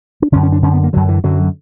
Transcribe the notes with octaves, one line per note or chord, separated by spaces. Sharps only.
D4
F#2 D3 C#4
C#4
D4
F#2 D3 C#4
B3
A#3
F#2 D3 F#3
E3
F#2 D3 F#3